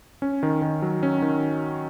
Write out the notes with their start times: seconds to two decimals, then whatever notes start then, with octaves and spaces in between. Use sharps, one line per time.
0.22 C#4
0.43 D#3
0.62 D#3
0.82 F#3
1.03 C#4
1.22 D#3